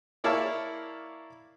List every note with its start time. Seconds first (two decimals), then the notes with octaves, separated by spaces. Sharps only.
0.24 A#3 E4 C#5 D5 F5 A5